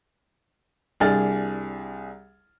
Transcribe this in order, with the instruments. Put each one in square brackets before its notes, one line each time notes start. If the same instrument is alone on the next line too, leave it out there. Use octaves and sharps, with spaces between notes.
[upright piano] C2 D4 G#4 F6 A6